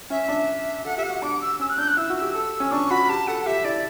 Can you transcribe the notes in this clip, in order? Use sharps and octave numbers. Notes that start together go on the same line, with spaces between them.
C#4 E5
D4
A4 F#5
G4 E5
F#5
F#4
D4 D6
E6
C#4 E6
F#6
D4 G6
F#6
E4 E6
F#4
E6
G4
A4
C#4
D4 C#6
F#4 B5
G4 A5
A4 F#5
F#5
G4 E5
E4 D5